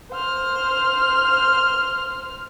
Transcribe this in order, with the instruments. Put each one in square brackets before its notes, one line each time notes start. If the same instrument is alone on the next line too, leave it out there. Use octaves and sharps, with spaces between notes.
[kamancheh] C5 F6